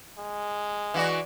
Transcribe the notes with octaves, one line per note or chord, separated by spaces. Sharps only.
G#3
E3 F#4 D5